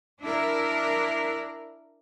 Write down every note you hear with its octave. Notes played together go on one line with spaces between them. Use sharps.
D4 E4 A#4